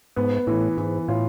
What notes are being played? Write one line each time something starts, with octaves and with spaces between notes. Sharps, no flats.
G#2 B3
A2 E3
G#2 E3
A2 F4